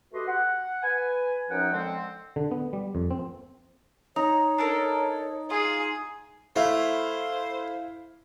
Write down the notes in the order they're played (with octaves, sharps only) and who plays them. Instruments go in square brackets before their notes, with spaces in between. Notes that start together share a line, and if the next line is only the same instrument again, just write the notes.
[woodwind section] A3 F#4 G4 B4 D#5 C6
F#5
B4 G#5
F#2 F3 C#4 D#4 F#5 G5
D3 F3 G#3 C4
[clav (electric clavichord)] D3
B3
G3
F2
C4
[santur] D#4 [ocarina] C#5 [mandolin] A#5
[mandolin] D4 A4 A#4
[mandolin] F4 [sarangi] G#4
[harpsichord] A3 [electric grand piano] E4 F5 [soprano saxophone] C5